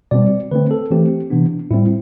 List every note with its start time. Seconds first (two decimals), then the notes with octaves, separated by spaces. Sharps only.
0.11 B2 G3 C4 D5
0.51 D3 A3 C4 B4
0.71 A4
0.91 E3 A3 C4 G4
1.30 C3 E3 B3 D4
1.71 A2 G3 C4 E4